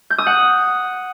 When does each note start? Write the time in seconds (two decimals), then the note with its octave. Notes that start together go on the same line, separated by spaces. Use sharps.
0.10 G6
0.18 D#6
0.26 F#5